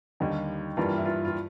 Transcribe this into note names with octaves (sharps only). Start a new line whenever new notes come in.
D#2 D3 G3 D#4
G2 E3 G3 A#3 F4
E4
F4
F4